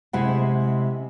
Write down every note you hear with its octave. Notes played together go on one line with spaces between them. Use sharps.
C3 G#3 E4 F#5